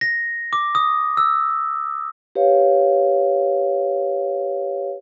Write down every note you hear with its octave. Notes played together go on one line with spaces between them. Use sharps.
A#6
D6
D#6
E6
G4 B4 C#5 F5